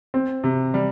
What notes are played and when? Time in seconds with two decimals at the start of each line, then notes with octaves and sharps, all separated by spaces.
0.14 C4
0.44 C3
0.74 G3